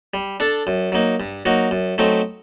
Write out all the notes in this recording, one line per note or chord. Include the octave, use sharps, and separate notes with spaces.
G3
D4 A4
F#2
F#3 A#3 D#4
G2
F#3 A#3 D#4 F#4
F#2
F#3 A3 C4 D#4